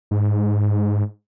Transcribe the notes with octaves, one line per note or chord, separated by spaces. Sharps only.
G#2